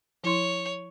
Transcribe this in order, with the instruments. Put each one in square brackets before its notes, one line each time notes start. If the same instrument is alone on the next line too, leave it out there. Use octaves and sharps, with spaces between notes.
[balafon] F3 E4 C6 [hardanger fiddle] C#5